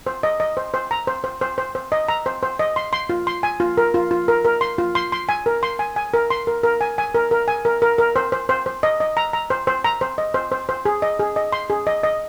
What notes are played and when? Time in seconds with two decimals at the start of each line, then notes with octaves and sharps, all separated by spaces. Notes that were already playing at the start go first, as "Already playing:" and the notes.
0.07 C5
0.23 D#5
0.40 D#5
0.57 C5
0.74 C5
0.91 A#5
1.07 C5
1.24 C5
1.41 C5
1.58 C5
1.75 C5
1.92 D#5
2.08 A#5
2.26 C5
2.43 C5
2.59 D#5
2.76 C6
2.93 C6
3.10 F4
3.27 C6
3.43 G#5
3.60 F4
3.78 A#4
3.94 F4
4.11 F4
4.28 A#4
4.45 A#4
4.61 C6
4.78 F4
4.95 C6
5.12 C6
5.29 G#5
5.46 A#4
5.63 C6
5.79 G#5
5.96 G#5
6.14 A#4
6.30 C6
6.47 A#4
6.63 A#4
6.81 G#5
6.98 G#5
7.15 A#4
7.31 A#4
7.48 G#5
7.65 A#4
7.82 A#4
7.98 A#4
8.16 C5
8.32 C5
8.49 C5
8.66 C5
8.83 D#5
9.00 D#5
9.17 A#5
9.33 A#5
9.50 C5
9.67 C5
9.84 A#5
10.01 C5
10.18 D#5
10.34 C5
10.52 C5
10.69 C5
10.85 G#4
11.02 D#5
11.19 G#4
11.36 D#5
11.53 C6
11.70 G#4
11.87 D#5
12.03 D#5